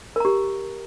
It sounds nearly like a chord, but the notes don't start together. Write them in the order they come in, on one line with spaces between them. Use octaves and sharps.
A#4 A#5 G4